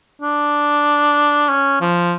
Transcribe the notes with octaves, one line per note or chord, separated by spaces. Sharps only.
D4
C#4
F3